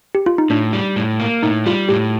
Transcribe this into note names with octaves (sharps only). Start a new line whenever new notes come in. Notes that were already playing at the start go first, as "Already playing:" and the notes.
G4
F4
D#4
A2 D4
G3
A2
A#3
A2 D#4
G3 F4
A2 G4